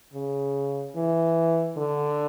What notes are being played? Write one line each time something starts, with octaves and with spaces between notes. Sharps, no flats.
C#3
E3
D3